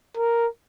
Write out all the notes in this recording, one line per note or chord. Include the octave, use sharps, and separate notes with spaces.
A#4